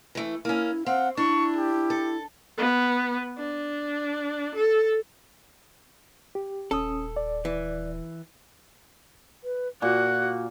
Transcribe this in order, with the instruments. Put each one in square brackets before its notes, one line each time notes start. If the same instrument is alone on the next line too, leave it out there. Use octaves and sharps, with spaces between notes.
[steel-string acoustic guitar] E3 A3
[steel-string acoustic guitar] A#3 C#4 [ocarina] E4
[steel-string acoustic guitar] C4 [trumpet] F5 [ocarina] F#5
[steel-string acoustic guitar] D4 [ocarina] E4 [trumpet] C#6
[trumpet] G4
[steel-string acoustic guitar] A4
[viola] B3
D4
A4
[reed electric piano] G4
[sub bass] D#1 [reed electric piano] C#4 D#6 [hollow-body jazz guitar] A4
[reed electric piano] D5
[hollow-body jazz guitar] E3
[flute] B4
[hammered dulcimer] A#2 [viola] F#4 [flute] F#6